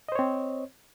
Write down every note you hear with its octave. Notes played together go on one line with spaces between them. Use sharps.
C4 C5 C#5 D#5